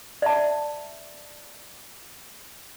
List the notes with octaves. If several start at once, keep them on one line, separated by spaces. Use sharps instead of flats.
D5 E5 A5